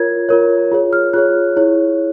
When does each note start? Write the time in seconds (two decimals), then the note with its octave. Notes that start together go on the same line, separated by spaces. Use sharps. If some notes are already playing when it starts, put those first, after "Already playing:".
Already playing: F4 A#4 C#5 G#6
0.29 F4 A#4 C#5
0.72 F4 G#4 C#5
0.93 F6
1.13 F4 G#4 C#5 F#6
1.57 E4 G#4 C#5